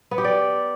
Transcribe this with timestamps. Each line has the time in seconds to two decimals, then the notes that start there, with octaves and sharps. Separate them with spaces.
0.11 B3
0.18 G4
0.24 D5